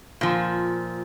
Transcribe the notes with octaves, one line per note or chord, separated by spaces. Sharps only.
A#2 F3